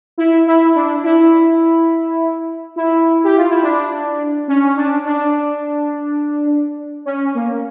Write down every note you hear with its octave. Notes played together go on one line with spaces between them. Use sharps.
E4
E4
D4
E4
E4
G4
F4
E4
D4
C#4
D4
D4
C#4
A#3